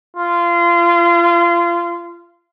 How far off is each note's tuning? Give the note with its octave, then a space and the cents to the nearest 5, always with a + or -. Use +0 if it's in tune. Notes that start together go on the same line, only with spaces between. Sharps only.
F4 -25